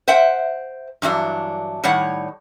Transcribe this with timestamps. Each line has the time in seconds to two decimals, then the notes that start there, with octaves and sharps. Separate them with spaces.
0.08 C5 E5 F#5 G5
1.02 G2 E3 F#3 D4
1.84 A2 D#3 G3 C#5 F#5